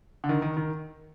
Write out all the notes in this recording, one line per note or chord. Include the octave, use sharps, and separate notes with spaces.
D3
D#3
D#3
D#3